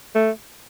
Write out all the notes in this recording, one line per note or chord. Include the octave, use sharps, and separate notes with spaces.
A3